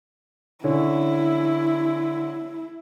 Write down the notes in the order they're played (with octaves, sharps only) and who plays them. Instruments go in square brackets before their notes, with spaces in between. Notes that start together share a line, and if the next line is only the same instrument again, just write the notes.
[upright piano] D3 C#4 [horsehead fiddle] E4